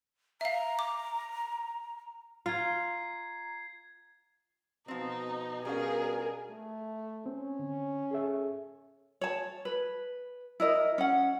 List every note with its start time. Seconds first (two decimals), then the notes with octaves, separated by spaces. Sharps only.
0.41 E5 F5 A#5
0.79 D6
2.46 F4 A#5 G#6 C7
4.88 B2 F3 C4 D#4
5.65 B2 G3 C#4 D4 G#4 A#4 F5 G#5
6.49 A3
7.26 C4 C#4
7.59 D3
8.11 G#4 A4 E5
9.21 C#5 A5
9.65 B4
10.60 E4 A#4 D#5
10.98 C#4 F#5